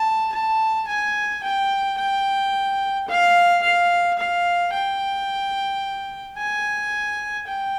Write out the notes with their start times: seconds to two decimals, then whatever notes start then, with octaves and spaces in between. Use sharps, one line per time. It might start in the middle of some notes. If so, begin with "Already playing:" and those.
Already playing: A5
0.33 A5
0.88 G#5
1.44 G5
1.98 G5
3.08 F5
3.63 F5
4.18 F5
4.73 G5
6.38 G#5
7.47 G5